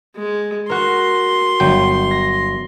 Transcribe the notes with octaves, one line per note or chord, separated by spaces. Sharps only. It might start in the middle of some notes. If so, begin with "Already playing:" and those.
G#3
F#4 A#4 C6
G1 F#3 G5
A#6